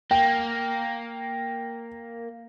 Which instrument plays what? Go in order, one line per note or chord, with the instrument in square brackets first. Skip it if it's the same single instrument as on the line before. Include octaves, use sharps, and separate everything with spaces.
[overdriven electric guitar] A#3 [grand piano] G5